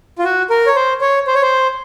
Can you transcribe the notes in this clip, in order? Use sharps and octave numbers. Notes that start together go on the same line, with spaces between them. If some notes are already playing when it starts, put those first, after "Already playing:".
F4
F#4
A#4
C#5
C5
C#5
C5
C#5
C5